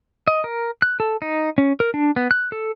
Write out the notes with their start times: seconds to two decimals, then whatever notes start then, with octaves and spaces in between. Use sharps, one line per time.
0.28 D#5
0.44 A#4
0.82 F#6
1.00 A4
1.22 D#4
1.58 C#4
1.80 A#4
1.94 D4
2.16 B3
2.31 F#6
2.52 A4